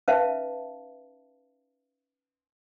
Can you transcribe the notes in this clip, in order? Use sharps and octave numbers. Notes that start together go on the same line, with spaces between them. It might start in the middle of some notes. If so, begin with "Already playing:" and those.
C#4 D#4 B4 E5 F5 A5